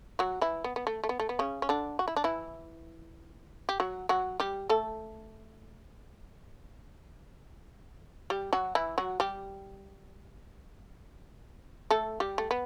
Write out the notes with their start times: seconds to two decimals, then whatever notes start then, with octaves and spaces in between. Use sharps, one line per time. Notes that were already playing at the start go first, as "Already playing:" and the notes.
0.19 F#3 F#4
0.41 E3 E4
0.64 B3
0.76 B3
0.87 A3
1.04 A3
1.09 B3
1.20 A3
1.29 B3
1.39 C#3 C#4
1.62 C#4
1.69 D3 D4
1.99 F#4
2.08 E4
2.16 D4
2.24 E3 E4
3.69 G4
3.80 F#3 F#4
4.09 F#3 F#4
4.40 G3 G4
4.69 A3 A4
8.30 G3 G4
8.53 F#3 F#4
8.75 E3 E4
8.98 F#3 F#4
9.20 G3 G4
11.91 A3 A4
12.20 G3 G4
12.38 A3
12.51 B3